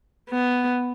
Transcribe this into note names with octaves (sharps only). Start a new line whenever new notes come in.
B3